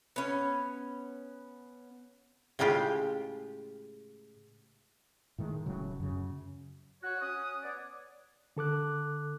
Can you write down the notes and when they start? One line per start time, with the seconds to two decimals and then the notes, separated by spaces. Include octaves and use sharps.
0.16 B3 C#4
2.59 A2 C#3 G#3 F4 G4
5.38 A2 D#3 G#3
5.66 D1 A2 C#3 F#3
6.00 F#2 C#3
7.03 F#4 C#5 F#6
7.21 C#4 D#6
7.63 B3 C#5 D5
8.57 D3 A4 D6 F#6